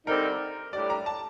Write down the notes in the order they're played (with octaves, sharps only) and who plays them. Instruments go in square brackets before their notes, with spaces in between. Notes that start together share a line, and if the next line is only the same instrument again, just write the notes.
[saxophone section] D3 G3 C4 D#4 [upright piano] A#4
[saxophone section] A2 G3 D4 G4 [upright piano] D5
[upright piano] A#5
A5